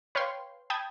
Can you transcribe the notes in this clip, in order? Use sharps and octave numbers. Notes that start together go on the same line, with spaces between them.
B4 C#5 F5 G5 C6
G5 A5 B5 D#6 G6 G#6